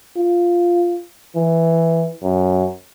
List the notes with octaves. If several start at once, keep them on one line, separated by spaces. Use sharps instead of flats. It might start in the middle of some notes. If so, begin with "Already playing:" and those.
F4
E3
F#2